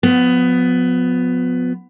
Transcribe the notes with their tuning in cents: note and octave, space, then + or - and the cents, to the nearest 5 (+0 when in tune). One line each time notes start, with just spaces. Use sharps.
F3 +45 B3 +15